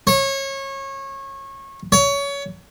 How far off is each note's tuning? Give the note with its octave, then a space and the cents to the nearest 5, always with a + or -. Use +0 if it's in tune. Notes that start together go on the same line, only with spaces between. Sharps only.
C#5 -25
C#5 +25